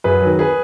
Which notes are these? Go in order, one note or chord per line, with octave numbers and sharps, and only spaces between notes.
F#2 G#4 B4
D#3 F#3
G#4 B4